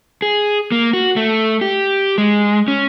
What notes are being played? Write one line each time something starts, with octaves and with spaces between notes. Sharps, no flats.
G#4
A#3
F#4
A3
G4
G#3
C#4